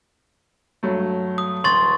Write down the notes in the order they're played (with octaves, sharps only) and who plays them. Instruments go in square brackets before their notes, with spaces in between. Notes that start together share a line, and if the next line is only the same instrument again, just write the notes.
[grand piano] G2 F#3 A3
[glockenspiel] D#6
[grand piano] D1 [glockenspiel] C6 C#6 A6